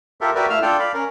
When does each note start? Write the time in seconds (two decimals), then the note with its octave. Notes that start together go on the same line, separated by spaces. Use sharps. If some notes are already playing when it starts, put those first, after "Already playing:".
0.21 F4 G4 A4 A#4 E5
0.35 F#4 G4 A#4 B4 D5 E5
0.50 A3 E4 F5 E6 F6
0.62 D4 F4 A4 D5 G5
0.79 D5 F5 B5
0.94 C#4 A#4